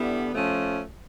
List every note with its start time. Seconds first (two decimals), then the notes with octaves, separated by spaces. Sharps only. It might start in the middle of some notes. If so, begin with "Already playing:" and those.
Already playing: D3 G3 B3 E4
0.33 F3 A3 C#4